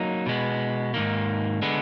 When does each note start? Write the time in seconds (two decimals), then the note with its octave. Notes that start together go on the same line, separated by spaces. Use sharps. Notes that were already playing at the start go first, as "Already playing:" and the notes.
Already playing: F#3 A#3 D#4
0.26 B2 G#3 B3
0.94 G#2 D#3 A#3
1.62 D3 G#3 B3